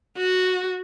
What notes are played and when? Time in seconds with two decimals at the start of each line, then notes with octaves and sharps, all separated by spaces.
0.17 F#4